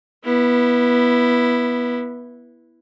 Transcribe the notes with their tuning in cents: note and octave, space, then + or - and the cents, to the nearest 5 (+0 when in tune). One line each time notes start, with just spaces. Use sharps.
B3 -15 E4 +0